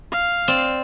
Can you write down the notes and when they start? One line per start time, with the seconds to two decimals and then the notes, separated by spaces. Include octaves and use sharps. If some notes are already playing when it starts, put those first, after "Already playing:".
0.12 F5
0.48 C4 D5